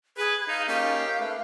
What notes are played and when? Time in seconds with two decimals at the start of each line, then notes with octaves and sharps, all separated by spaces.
0.18 G#4 B4
0.48 D#4 F5
0.68 A#3 C#4 D#4 G4 F5
1.20 A3 B4